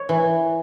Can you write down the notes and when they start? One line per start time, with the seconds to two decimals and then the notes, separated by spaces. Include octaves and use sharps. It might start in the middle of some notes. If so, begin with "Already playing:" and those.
Already playing: C#5
0.09 E3